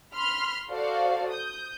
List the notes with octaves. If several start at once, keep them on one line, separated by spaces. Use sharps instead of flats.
B5 C6 F6
F#4 A4 C5 D5 F5
D#6 G6